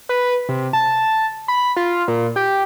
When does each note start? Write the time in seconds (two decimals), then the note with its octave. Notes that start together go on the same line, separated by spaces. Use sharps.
0.09 B4
0.49 C3
0.73 A5
1.48 B5
1.77 F4
2.08 A#2
2.36 G4